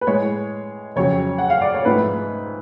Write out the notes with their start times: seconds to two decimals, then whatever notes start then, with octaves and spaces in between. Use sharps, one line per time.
0.01 B4
0.07 A2 G#3 C#5
0.96 F2 C#3 F#3 C#5
1.38 F#5
1.50 F5
1.62 D5
1.74 C#5
1.85 G#2 F3 A3 B4